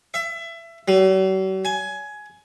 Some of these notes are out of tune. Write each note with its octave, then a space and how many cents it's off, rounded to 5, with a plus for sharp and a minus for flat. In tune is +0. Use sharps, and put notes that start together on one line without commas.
E5 +25
F#3 +45
G#5 +15